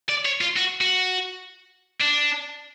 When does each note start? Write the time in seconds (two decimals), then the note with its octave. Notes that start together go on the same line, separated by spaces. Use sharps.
0.09 D5
0.25 C#5
0.41 F4
0.57 F#4
0.81 F#4
2.00 D4